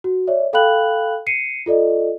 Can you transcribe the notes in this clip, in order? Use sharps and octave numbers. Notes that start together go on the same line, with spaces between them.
F#4
C#5 D5 E5
A4 F5 G5 B5 F#6 F#7
C7 C#7 D#7
F4 A4 D5 D#5